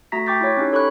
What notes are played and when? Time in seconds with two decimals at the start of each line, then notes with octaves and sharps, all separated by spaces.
0.12 A3 F#4 A#5 A#6 B6
0.26 G5 C#6 D6 G6 A6 B6
0.41 E4 C#5
0.57 C#4 D#4 G4
0.72 A4 C#5 B5 C#6 F#6